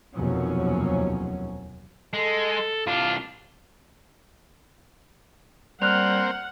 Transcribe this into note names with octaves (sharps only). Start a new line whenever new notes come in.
F1 D#2 B2 F3 F#3 C#4
G#3 A4
C2 D4 F4
G3 A#3 C4 C5 F#5 F6 F#6 F7